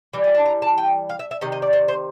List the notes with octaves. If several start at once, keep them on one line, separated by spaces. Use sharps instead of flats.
E3 G3
G#5
A5
A#5
A5
G5
F5
E5
E5
C3 D#3 D#5
D#5
D5
C5
C5